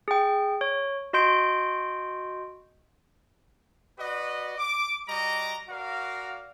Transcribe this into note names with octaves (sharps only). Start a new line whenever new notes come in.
G#4 G5
C#5
F#4 D#5 C6 G6 D7
F#4 B4 D5 D#5
D6
G3 F#4 D#5 A#5 D6
F#4 A#4 D5 F5